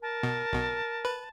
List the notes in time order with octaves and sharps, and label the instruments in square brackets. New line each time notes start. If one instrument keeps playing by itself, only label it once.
[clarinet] A#4 [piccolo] A5
[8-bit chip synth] B2
B1 B2
B4